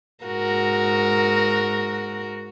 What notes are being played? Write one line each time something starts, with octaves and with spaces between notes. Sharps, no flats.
G#2 F#4 A#4